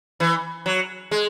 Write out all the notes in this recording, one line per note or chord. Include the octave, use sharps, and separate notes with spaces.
E3
F#3
G#3